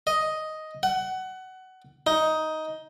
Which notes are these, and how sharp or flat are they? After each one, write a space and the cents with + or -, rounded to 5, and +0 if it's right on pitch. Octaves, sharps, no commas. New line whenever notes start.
D#5 +5
F#5 +20
D#4 +10